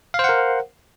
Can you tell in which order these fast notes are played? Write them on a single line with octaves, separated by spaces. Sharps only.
F5 C5 F#5 A#4